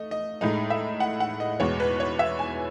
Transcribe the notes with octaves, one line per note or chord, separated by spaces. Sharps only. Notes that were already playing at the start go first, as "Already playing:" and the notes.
Already playing: A3 D#5
D#5
A2 G#3 D#4
E5
F#5
F#5
D#5
E2 B2 G#3 C#5
B4
C#5
E5
G#5